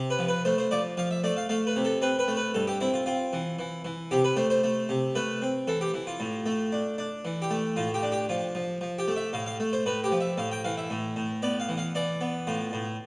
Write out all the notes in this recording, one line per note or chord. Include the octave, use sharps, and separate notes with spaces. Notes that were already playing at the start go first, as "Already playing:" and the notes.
Already playing: C3
B4
F3
B4
A3 C5
C5
F3 D5
F3 F5
E5
A3 D5
F5
A3 F5
B4
C3
A4
C4 B4
B4
A3
B4
G2 A4
G4
C4 E4
F4
C4 F4
E3
E3
E3
C3 G4
B4
A3 C5
C5
A3
C3
A3 B4
C4
E3 A4
G4
E3
F4
A2
A3
D4
D4
E3
G4
A3
A2 F4
G4
D4
G4
F3 F4
F3
F3
G4
A3
E5
A2 F5
F5
A3
C5
A2 B4
G4
F3
E5
A2 F5
G5
E3 F5
E5
A2
A2
B3 D5
F5
E3
F5
E3 D5
B3
A2 F4
A2